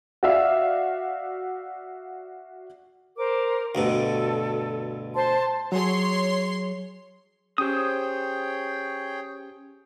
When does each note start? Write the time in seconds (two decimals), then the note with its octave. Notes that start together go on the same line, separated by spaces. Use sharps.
0.23 F#4 D5 E5 F5
3.17 A#4 C5 D6
3.75 D2 G2 B2 A4
5.15 C5 A5 C6
5.72 F#3 G#4 C#5 C6
7.58 C#4 G4 G#4 C5 C#5 G5 D#6